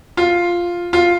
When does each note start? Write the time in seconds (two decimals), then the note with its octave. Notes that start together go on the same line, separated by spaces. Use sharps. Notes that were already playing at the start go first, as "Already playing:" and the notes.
0.17 F4
0.93 F4